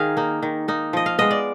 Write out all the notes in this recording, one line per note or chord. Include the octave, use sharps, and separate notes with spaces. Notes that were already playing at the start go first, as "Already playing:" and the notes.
Already playing: D#3 G#4 F5
A#3 D#4
D#3
A#3 D#4
F3 D#5
F5
G#3 B3 D#5
D5